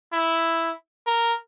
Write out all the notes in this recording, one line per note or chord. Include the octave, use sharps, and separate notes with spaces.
E4
A#4